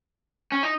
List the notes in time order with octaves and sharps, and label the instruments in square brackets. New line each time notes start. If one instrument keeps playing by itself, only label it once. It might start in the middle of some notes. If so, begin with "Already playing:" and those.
[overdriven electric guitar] C#4
D#4